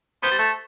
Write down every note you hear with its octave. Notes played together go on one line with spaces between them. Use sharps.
B3 C5
G3
A3